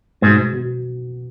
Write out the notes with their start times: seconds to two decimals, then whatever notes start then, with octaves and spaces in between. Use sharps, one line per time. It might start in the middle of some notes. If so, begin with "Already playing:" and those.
0.22 G#2 B2
0.53 B2